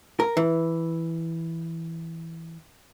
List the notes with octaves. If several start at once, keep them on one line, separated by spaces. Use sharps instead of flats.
A#4
E3